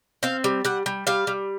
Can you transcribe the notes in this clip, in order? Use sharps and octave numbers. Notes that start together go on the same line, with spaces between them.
C4 F5
G3
G3 F#5
G3
G3 F5
G3